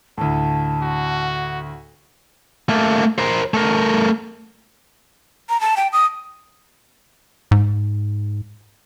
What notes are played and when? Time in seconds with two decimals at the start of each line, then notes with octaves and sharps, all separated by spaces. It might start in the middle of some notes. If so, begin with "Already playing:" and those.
0.18 D2 A2 A5
0.82 F#4
2.69 A3 A#3
3.18 A#4 C5
3.54 A3 A#4
5.49 A#5
5.61 A5
5.77 G5
5.93 D#6
7.51 G#2